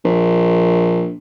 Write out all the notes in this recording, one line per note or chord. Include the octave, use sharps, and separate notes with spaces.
A#1